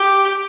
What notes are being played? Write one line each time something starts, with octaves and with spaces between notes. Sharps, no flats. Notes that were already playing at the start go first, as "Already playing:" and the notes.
Already playing: G4